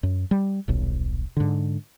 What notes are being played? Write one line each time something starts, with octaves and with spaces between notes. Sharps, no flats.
F#2
G3
D#1 B1
G#2 D3